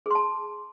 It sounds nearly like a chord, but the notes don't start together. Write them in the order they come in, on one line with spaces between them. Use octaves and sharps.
G#4 C6 A5